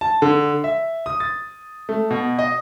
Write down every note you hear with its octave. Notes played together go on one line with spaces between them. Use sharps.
A5
D3
E5
D#6
A6
A3
B2
D#5